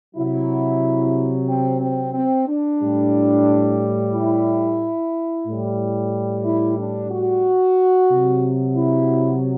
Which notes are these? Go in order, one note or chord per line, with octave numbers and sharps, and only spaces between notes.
C3 F#3 E4
C4
C4
C4
D4
A2 G3
E4
A2 G3
E4
D4
F#4
C3 F#3
E4